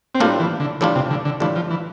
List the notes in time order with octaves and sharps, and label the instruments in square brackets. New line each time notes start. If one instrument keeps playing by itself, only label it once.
[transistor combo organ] C4
[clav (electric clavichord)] A2 G3 D4 F4 [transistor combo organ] A#3
[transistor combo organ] E3
D3
[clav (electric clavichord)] A2 G3 D4 F4 [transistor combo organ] E3
[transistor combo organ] C3
D3
D3
[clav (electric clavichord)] A2 G3 D4 F4 [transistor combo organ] E3
[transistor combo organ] F3
E3